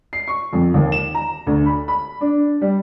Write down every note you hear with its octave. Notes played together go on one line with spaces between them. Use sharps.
C7
C#6
F2
D#2
E7
A#5
D2
B5
B5
D4
G3